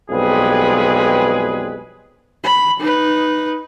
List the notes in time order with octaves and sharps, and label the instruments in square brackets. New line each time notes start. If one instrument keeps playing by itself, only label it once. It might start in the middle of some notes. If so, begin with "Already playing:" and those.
[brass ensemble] B1 F2 G3 G#3 G#4 B4
[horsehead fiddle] B5
D#4 B4